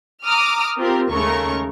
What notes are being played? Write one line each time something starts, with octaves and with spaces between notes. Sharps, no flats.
A#5 D6 D#6 F6
C4 F4 G4 A#4
D#2 C#3 G#3 A3 A#4 C#6